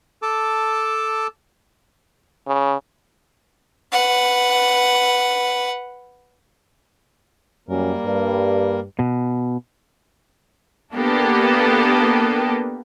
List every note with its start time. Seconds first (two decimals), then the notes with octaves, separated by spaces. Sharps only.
0.22 A4 A5 D6
2.47 C#3
3.93 B4 F#5
7.69 F#2 G3 A#3 A#4
8.06 G2
8.99 B2
10.95 A#3 B3 D4 G4 A4